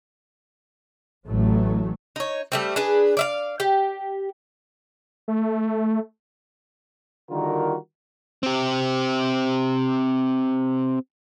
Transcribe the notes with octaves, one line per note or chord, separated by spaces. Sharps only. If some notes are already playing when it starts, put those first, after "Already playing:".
A1 A2 F#3 A3
D#4 C#5
G3 A3 C4
D4 G#4 B4
D5 E5 F5
G4
A3
D3 D#3 G3 F4 F#4 A#4
C4 G4